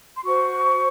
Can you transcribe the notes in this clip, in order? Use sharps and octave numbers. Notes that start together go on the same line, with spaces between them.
C6
F#4 C5 C#6